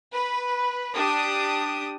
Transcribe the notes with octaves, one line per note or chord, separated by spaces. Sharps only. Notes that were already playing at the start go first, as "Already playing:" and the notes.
B4
D4 G4 D#6